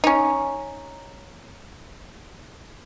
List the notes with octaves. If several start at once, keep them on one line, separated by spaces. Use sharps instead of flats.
C#4 D#4